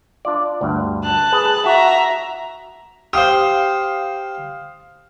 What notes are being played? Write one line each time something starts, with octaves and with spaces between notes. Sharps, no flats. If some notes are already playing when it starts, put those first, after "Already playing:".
D4 F4 D5
D2 G2
A5 F#6
G#4 B4
F#4 E5 A#5
G4 C5 F5 D#6